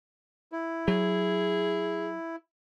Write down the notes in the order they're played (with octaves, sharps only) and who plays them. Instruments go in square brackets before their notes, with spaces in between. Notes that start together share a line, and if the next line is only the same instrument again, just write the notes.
[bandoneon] E4
[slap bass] F#3 [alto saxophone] G#4